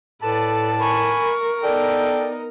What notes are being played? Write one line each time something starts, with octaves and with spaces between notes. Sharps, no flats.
A2 A4 B4 D5 A5
A#4 G#5 B5 C#6
B3 D#4 A4 D5 G5